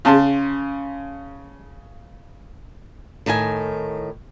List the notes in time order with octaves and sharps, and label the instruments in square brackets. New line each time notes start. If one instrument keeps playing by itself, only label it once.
[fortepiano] C#3 C#4 A5 C6
[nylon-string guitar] A2 D#3 D#5 G#5